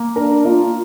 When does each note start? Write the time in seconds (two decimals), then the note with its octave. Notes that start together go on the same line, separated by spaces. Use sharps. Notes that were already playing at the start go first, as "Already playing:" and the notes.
Already playing: A#3
0.16 D4 A#4
0.45 A#3 F4